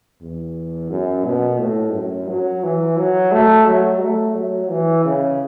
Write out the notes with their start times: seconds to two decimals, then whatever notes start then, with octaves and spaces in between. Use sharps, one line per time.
0.22 E2
0.91 F#2
1.25 B2
1.60 A2
1.94 F#2
2.29 F#3
2.64 E3
2.97 F#3
3.32 A3
3.66 F#3
4.02 A3
4.35 F#3
4.71 E3
5.05 C#3